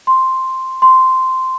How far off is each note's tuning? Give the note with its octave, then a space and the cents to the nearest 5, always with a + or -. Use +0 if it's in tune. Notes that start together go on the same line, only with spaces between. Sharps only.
C6 +0
C6 -10